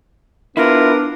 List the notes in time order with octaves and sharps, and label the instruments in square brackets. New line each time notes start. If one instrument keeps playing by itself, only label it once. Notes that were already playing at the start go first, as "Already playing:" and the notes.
[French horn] B3 [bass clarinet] D4 [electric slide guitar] E4 F4 [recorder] A#4